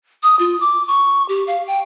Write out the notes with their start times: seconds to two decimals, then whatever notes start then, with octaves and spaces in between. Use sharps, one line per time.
0.23 D#6
0.39 F4
0.60 D6
0.88 C#6
1.29 G4
1.47 F5
1.67 G5